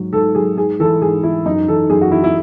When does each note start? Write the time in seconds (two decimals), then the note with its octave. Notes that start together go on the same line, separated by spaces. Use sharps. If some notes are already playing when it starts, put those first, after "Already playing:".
Already playing: G#2 F#3
0.13 G#2 A4
0.35 F#3 G#4
0.57 G#2 G#4
0.80 E3 A4
1.01 G#2 G#4
1.23 E3 E4
1.46 F#2 D#4
1.68 E3 A4
1.90 F#2 G#4
2.01 F#4
2.11 E3 E4
2.24 E4